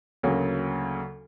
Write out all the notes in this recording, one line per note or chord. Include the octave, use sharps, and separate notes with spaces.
D2 C#3 F#3 A#3